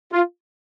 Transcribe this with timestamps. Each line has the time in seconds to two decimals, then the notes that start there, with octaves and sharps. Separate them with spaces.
0.13 F4